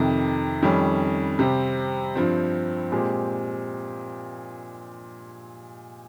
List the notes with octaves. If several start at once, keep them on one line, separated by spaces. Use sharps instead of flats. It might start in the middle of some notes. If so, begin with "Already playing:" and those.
Already playing: F2 C3 D#3
F2 D#3 G3 C#4
C3 G3 C4 G4
G2 F3 C4
A#2 G#3 C4 G4